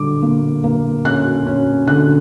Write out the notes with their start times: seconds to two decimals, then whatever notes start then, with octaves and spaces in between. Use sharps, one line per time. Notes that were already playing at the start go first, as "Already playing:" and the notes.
Already playing: D3 G3 D6
0.22 A#3
0.64 A#3
1.05 C#4 F#6
1.47 C#4
1.87 D3 F#6